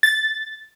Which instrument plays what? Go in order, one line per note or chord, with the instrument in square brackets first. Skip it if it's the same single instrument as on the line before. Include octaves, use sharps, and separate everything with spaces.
[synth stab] A6